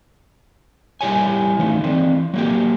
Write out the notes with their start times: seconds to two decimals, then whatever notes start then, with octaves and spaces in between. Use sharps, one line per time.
1.01 G3 E4 G4 C#5 G#5
1.59 E3 A3 D#4
1.81 E3 C4
2.34 F#3 A#3 G4